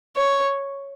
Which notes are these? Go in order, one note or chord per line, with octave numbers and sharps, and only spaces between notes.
C#5